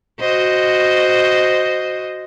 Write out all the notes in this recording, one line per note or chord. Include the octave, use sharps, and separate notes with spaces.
F#4 C5 D#5